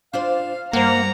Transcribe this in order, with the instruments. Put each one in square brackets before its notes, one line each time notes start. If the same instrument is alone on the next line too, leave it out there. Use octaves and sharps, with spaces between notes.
[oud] D4 F4 C5 [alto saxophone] F5
[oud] G2 C5 [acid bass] A#3 [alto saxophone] F#5 [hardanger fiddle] A#5